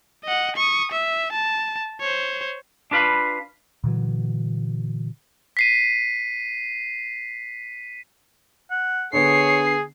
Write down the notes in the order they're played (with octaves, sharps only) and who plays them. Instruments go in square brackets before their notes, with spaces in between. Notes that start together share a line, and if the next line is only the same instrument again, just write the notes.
[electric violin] D#5 F#5
C#6 D#6
E5
A5
C5 C#5
[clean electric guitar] D4 F4 B4 F5 B5
[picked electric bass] A#2 D3 E3 F#3
[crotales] B6 C7 D#7
[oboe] F#5
[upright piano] D3 B3 [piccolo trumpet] G#4 [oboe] C#5 [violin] C7